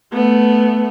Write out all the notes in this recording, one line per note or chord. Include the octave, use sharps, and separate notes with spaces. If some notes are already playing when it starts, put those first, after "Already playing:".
A3 B3